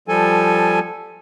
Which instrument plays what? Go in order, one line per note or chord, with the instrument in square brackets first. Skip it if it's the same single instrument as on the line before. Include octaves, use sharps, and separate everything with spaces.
[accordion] F3 G3 A4 G#5